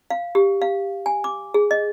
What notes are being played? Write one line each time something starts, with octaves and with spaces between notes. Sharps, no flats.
F5
G4
F5
G#5
D6
G#4
D#5